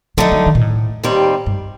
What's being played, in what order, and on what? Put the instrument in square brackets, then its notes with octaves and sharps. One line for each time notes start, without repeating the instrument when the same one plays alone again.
[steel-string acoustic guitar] D3 A3 D#4 [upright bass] F#3
[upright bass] F#3
D#3
A#2
A2
[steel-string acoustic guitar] D#2 D#3 G3 C4
[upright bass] G2